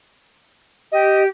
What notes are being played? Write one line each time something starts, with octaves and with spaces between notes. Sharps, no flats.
G4 D#5